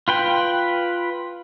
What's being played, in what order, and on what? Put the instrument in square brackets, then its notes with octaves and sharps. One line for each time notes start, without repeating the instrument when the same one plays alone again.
[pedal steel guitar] F4 B4 G5